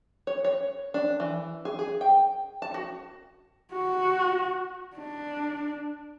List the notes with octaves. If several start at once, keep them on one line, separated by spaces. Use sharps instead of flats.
C#5
C#5
D4
E3
G#4
G#4
G5
A5
F#4
F#4
D4